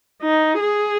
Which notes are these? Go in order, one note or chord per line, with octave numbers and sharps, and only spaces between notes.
D#4
G#4